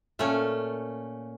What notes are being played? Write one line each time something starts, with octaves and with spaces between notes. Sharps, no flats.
A#2 A3 C#4